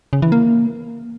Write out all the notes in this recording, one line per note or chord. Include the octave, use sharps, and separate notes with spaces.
C#3
E3
A#3